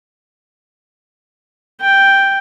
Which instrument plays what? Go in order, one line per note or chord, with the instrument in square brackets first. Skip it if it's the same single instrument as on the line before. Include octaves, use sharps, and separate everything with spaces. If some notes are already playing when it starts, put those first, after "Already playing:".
[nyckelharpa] G5